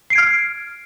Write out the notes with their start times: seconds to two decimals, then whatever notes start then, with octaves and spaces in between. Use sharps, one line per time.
0.10 C7
0.13 D7
0.16 G#6
0.18 F6